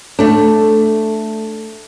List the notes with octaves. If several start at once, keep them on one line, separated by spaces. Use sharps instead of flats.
A3 D4